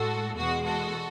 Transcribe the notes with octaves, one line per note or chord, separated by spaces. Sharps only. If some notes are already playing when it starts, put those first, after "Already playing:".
Already playing: A2 G#3 F#4 A4
E2 B2 G#3 F#4
F#4 A4